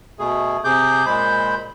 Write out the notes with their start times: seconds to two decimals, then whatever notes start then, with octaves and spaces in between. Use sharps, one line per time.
0.19 B2 A3 G#4
0.64 C3 G#4 D6 G6
1.06 A#2 G#3 C5 B5 G6